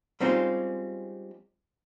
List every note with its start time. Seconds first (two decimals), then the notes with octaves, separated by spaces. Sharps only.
0.20 G3 G#3 C4 C#4 D#4 F4